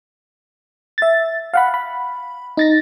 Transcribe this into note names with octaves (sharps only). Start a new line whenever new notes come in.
E5 A6
F5 F#5 B5
B5
D#4 A6 A#6